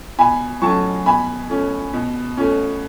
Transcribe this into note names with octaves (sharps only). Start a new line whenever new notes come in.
B2 G#5 B5
F#3 A3 C#4 A5 C#6
B2 G#5 B5
A3 C#4
B2
A3 C#4